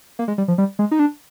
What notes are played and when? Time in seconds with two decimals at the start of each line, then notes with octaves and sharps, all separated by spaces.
0.19 A#3
0.28 G#3
0.38 G3
0.48 F3
0.58 G3
0.79 G#3
0.91 D#4
0.99 D4